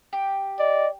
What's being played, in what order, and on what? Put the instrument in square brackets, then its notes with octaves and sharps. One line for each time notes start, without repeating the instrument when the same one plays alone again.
[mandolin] G4
[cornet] D5 [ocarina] D#5